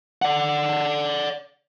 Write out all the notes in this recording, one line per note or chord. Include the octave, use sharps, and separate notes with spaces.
D5 F#5